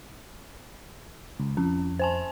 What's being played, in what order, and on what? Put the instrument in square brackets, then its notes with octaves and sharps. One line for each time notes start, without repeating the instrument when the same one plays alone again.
[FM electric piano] C#2
[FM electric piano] F2 [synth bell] C#4
[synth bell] C5 G#5 A5